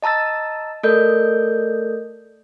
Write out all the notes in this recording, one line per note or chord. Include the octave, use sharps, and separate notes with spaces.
D#5 A5 A#5 E6 A6
A3 A4 A#4 D5 D#5 G6